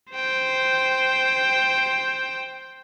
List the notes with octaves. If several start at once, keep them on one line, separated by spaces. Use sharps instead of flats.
C5 G5